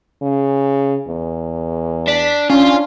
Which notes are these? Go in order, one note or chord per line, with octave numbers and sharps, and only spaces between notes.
C#3
E2
D4 B6
C#4 D4 F4